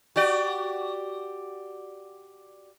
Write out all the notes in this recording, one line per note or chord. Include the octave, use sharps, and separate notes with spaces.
F#4 G4 D5